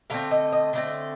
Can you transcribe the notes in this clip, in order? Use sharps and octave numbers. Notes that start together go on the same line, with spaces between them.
D3 A3 C4 F5
D#5
D#5
D3 A3 C4